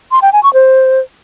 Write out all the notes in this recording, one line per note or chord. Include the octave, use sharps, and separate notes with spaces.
C6
G5
G#5
C#6
C5